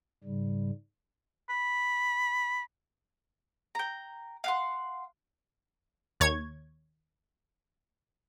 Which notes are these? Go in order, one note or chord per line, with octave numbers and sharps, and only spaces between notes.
G#2 C#3 G3
B5
G5 A#5
F5 F#5 C6
D#2 C#5 G#6